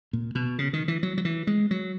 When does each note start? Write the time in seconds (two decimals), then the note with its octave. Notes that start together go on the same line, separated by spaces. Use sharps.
0.13 A#2
0.35 B2
0.59 C#3
0.73 D#3
0.88 E3
1.03 F#3
1.18 F#3
1.25 E3
1.47 G#3
1.71 F#3